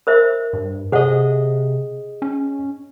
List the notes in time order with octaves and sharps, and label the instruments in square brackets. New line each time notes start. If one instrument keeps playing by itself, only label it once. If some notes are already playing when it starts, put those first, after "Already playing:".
[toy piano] A#4 C5 E5
[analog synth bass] G2
[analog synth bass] C3 [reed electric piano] G#4 D#5 [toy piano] A4 C5 F#5
[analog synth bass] C#4